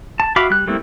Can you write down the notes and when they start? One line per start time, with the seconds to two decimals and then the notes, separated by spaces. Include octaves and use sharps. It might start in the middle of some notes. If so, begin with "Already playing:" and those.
0.20 A5
0.36 F#4 E5 F5 B5 D6
0.50 G3 F#6
0.67 G3 A3 A#3 C4 E4